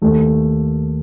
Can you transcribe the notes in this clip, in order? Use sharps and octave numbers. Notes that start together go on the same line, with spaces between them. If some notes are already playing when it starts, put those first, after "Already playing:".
D#2 A3